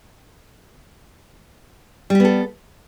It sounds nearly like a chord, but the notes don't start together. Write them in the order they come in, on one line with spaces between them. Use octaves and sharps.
G3 G4 B3 A4